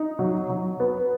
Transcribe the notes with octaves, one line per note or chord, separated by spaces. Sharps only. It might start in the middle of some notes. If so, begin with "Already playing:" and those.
Already playing: D#4
F#3
F#3
B3